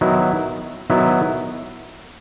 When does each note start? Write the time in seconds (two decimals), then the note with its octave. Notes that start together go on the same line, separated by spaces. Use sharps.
0.01 D#3 F#3 B3 E4
0.90 D#3 F#3 B3 E4